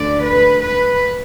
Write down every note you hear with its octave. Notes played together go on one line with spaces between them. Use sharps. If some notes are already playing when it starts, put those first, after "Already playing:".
Already playing: D2 D3 A3 D5
B4
B4